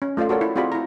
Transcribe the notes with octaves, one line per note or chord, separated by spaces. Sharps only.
C#4
A3 F4 A4 D5 F5
F#4 A4 A#4 C#5 D5
E4
C4 F4 F#4 G#4 D5 B5
E4 A#5